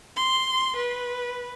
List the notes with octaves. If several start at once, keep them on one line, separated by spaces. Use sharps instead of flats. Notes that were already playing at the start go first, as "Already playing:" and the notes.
C6
B4